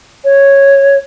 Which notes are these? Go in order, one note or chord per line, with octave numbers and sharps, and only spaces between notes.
C#5